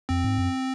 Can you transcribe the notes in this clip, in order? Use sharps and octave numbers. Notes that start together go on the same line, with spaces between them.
F2 C4
G#2
F#2